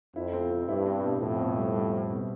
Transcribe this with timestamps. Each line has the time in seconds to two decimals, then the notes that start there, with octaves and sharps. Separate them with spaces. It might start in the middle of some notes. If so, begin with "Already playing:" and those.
0.15 F2 E4
0.33 C4
0.50 C4
0.68 G2 E4
0.86 C4
1.03 B2
1.21 F2 A2 C4
1.39 B2
1.57 G3
1.75 G3
1.92 C4
2.10 B2